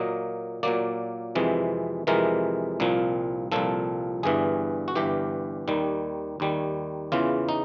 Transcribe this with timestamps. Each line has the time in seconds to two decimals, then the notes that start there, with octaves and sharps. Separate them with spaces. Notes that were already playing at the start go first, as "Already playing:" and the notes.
Already playing: A#2 F#3 A#3 D#5
0.63 A#2 F#3 A#3 D5
1.35 F2 C3 E3 G#3
2.07 F2 C3 E3 G#3 A#4
2.80 C2 A#2 F3
3.52 C2 A#2 F3 A4
4.23 G1 G2 E3 G#4
4.88 F#4
4.95 G1 G2 E3 G4
5.68 D#2 D#3 G3
6.40 D#2 D#3 G3
7.12 E2 C#3 E3 F4
7.49 D#4